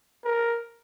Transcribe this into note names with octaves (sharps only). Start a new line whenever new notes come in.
A#4